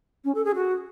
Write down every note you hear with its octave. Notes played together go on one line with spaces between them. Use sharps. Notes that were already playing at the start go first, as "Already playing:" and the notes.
C#4
A4
G#4
F#4